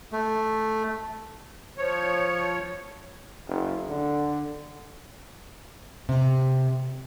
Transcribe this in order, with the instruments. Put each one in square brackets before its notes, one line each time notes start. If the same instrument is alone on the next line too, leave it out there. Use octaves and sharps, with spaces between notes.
[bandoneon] A3
[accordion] F3 C#5
[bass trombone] F#1
D3
[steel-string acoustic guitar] C3